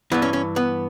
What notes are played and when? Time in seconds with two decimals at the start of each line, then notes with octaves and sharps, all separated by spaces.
0.12 G2 E3 B3
0.22 C#4
0.33 C#4
0.56 B3